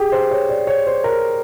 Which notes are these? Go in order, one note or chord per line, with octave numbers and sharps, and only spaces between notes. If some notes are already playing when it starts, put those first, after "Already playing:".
Already playing: G4 G#4
C5
C#5
D5
C#5
C5
A#4